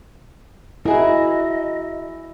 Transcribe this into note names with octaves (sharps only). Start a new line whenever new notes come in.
E4 F#4 G#4 A#4 D#5